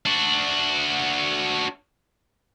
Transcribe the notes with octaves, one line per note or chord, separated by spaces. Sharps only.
D4 F#4